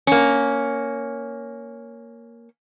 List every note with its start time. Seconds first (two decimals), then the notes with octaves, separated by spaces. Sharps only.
0.07 A#3 C#4